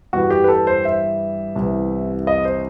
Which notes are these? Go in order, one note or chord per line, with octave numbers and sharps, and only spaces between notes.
G2 E3 G3 B3 F#4
G4
B4
A4
C5
E5
C2 C3 E3 B3
D#5
C5